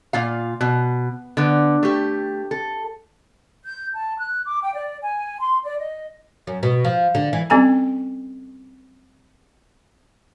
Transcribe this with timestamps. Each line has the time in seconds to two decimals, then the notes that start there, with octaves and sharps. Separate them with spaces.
0.13 A#2 F4 F5
0.61 B2
1.37 D3 B3
1.83 A3 G4
2.51 A4
3.64 G6
3.93 A5
4.19 F#6
4.45 D6
4.61 G5
4.73 D5
5.01 G#5
5.40 C6
5.64 D5
5.80 D#5
6.47 F#2
6.63 B2
6.85 F3
7.15 D3
7.33 E3
7.50 G3 C4 C#4 A4 G#5 A#5